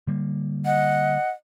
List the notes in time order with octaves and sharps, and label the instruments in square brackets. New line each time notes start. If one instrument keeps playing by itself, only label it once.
[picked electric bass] D3 G3 A#3
[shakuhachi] D#5 [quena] F#5